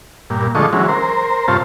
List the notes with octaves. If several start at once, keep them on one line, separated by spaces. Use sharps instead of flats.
G2 A#2
D3 F3 G#3 A3 D#5 C#6
E3 F#3 G#3 C#4
A#4 C5
G2 C3 F4 C5 C#5 A5